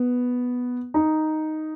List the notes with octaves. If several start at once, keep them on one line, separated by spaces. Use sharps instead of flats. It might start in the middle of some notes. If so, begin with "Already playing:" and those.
Already playing: B3
D#4